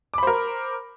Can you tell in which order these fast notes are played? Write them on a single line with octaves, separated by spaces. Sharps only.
D6 B5 C5 A#4